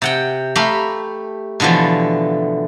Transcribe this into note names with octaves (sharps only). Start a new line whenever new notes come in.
C3 F#5 G5
A3 G4 F5 A#5 B5
B2 D3 E3 F3 A3